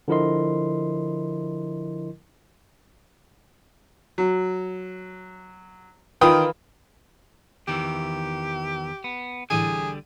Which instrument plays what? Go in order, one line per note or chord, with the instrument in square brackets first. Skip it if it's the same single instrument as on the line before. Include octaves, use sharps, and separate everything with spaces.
[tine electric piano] D3 F3 E4 A#4 D#5 C6
[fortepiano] F#3
[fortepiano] D#3 G5 D#6 [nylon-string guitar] E3 F4 B4
[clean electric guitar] E2 D#3 E3 [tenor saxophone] G4
[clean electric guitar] B3
[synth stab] A1 E3 D#7 [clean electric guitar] D3 G3 [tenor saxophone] G#4